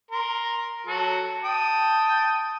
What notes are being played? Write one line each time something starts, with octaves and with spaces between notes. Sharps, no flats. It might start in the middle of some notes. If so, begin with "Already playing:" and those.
A#4 C6
F#3 F#4 A4
G5 A5 D#6